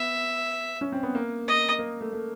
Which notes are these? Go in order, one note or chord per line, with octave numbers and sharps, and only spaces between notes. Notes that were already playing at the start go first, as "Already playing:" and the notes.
Already playing: B3 E5
C#4
C4
B3
A#3
D#5
A#3
A3
A3